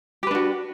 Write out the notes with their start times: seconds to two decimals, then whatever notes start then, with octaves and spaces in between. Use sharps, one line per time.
0.23 G4
0.27 B4
0.31 D4
0.35 F#4